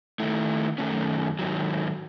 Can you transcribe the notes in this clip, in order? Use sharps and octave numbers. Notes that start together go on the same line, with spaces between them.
D#3 A3 E4
F#2 D#3 A3 C#4
G#2 D#3 F#3